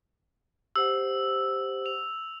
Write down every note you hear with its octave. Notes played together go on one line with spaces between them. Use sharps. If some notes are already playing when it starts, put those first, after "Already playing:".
G4 C5 F#5 E6
F7